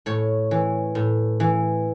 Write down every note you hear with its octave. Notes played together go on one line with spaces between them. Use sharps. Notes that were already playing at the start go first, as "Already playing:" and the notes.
A2 C#5
E3
A2
E3